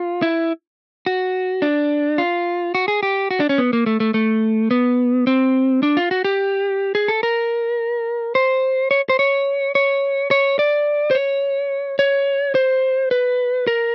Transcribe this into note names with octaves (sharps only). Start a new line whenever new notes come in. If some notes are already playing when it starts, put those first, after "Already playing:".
Already playing: F4
E4
F#4
D4
F4
F#4
G#4
G4
F#4
D4
C#4
B3
A#3
A3
A3
A3
B3
C4
D4
F4
F#4
G4
G#4
A4
A#4
C5
C#5
C5
C#5
C#5
C#5
D5
C5
C#5
C#5
C5
B4
A#4